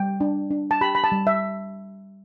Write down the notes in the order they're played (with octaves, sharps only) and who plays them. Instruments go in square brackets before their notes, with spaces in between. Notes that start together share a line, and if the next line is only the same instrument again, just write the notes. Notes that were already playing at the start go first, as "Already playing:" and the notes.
Already playing: [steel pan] G3 G5
D4
D4
A5
G4 B5
B5
A5
G3
E5